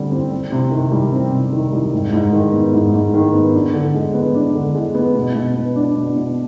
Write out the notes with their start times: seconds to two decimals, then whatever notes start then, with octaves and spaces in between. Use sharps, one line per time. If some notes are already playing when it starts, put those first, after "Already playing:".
Already playing: D3 G3 C4
0.11 C4
0.31 C4
0.52 C3
0.71 D#3
0.92 G3
1.12 C4
1.32 C3
1.53 D#3
1.73 G3
1.93 G#2
2.13 G#2
2.33 D#3
2.53 B3
2.73 G#2
2.94 G#2
3.14 D#3
3.34 B3
3.54 D4
3.74 D3
3.94 G#3
4.14 B3
4.34 D4
4.55 D3
4.75 G#3
4.95 B3
5.15 B2
5.35 B2
5.56 B3
5.75 D4
5.95 B2
6.16 B2